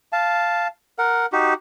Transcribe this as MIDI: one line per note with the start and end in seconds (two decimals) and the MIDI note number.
0.13 0.68 77
0.13 0.68 81
0.99 1.26 70
0.99 1.26 78
1.32 1.54 63
1.32 1.54 66
1.32 1.54 67